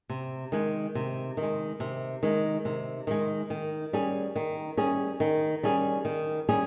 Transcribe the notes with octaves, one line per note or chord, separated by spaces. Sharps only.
C3
D#3 G#3
C3
D#3
G#3
C3
D#3 G#3
C3
D#3 G#3
D#3
G3 C#4 G#4
D#3
G3 C#4 G#4
D#3
G3 C#4 G#4
D#3
G3 C#4 G#4